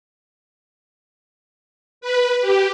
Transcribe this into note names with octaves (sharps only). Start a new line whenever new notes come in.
B4
G4